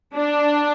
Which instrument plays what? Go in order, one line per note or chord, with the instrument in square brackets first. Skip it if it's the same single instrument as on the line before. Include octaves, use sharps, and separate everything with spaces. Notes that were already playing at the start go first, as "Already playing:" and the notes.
[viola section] D4